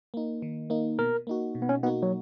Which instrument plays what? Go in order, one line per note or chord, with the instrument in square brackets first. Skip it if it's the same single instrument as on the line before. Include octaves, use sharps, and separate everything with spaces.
[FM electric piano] A#3 D#4
D#3
A#3 D#4
[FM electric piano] B2 [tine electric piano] A#4
[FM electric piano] A#3 D#4 F#4
B2
[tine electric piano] B3
C#4
[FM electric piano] A#3 D#4 F#4 [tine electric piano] B3
[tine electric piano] F#3